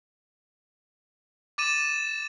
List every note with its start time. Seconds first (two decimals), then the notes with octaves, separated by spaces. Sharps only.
1.58 D6 A6 D#7 E7